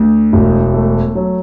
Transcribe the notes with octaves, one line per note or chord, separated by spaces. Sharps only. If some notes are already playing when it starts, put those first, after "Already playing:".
Already playing: D2
E1
A3
F#3